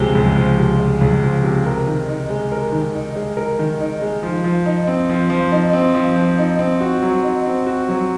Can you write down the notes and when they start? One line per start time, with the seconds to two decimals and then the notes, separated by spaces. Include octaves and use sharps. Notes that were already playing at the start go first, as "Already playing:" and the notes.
Already playing: C#2 C3 F3 G#3
0.15 C#2
0.36 F3
0.59 C3
0.80 G#3
1.01 C#2
1.23 F3
1.43 C3
1.66 A#4
1.88 D#3
2.08 D#4
2.30 G#3
2.52 A#4
2.72 D#3
2.95 D#4
3.16 G#3
3.37 A#4
3.59 D#3
3.80 D#4
4.02 G#3
4.23 F3
4.44 F3
4.66 D#4
4.87 C4
5.10 F3
5.30 F3
5.52 D#4
5.73 C4
5.95 F3
6.16 F3
6.38 D#4
6.59 C4
6.80 F#4
7.02 F#3
7.23 D#4
7.46 C4
7.67 F#4
7.88 F#3